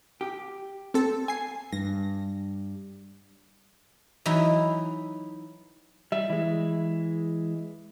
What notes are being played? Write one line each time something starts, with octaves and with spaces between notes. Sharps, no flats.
G4
C4 A4
G#5 C7
G2 A#6
E3 F#3 D#4 E4
G3 E5
E3 G#3